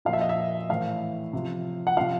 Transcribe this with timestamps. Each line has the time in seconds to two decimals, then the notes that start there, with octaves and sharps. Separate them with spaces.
0.05 A#2 F3 F5
0.13 E5
0.21 D#5
0.29 E5
0.69 A2 E3 F5
1.33 C3 F3
1.87 F#5
1.97 C3 F3 F5